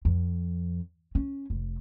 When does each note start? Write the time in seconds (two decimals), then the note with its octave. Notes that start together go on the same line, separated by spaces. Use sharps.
0.05 F2
1.15 C#4
1.50 F1